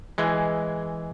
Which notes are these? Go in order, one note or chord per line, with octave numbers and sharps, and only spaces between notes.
E3 G#3